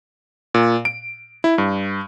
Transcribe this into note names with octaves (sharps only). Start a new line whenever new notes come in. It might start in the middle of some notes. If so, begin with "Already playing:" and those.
A#2
D7
E4
G2